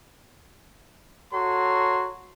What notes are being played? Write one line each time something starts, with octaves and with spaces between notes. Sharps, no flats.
F#4 A4 C#5 A#5 C6